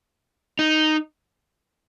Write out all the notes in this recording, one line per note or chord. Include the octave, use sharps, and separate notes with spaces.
D#4